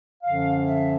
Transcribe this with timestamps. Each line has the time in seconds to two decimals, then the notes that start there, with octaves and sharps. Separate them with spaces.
0.23 F#2 D3 F3 F5
0.66 E5